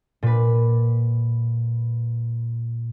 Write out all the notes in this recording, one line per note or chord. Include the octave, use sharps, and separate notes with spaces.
A#2 B4